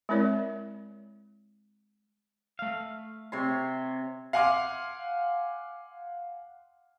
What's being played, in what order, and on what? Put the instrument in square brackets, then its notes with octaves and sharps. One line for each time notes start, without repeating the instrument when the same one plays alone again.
[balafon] G#3 C4 E4 A#4 C#5 D5
[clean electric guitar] A3 F5
[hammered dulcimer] C3 C#5 C6
[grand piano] F5 F#5 G#5 C6 D6 F6